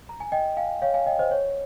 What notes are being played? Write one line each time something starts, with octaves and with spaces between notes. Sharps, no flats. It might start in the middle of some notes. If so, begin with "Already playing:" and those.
A#5
G#5
D#5 G5
F5 G#5
C#5 F5
F5 G#5
D#5 G5
C5 D#5
C#5